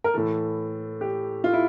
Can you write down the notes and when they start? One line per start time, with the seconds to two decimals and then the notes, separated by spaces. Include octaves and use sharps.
0.04 A#4
0.14 A2 E3 A4
1.01 G4
1.44 F4
1.53 E4